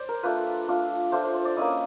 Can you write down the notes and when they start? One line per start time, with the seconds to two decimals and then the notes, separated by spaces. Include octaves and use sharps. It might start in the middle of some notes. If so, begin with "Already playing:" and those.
Already playing: C5 D5
0.09 A#4
0.23 A3 D4 F4 B4
0.68 A3 D4 F4
1.12 A3 D4 F4 C5
1.23 C5
1.34 C5
1.45 D5
1.57 A#3 C#4 E4 D#5